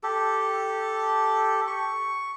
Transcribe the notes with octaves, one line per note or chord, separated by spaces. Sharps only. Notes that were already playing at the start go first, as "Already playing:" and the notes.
G4 A4
C#6